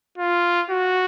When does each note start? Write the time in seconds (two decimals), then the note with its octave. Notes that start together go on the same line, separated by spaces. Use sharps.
0.18 F4
0.70 F#4